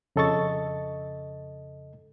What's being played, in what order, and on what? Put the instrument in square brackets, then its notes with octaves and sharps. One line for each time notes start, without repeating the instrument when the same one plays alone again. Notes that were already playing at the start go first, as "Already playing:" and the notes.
[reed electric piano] F2 C#3 A4 D#5 C#6 A6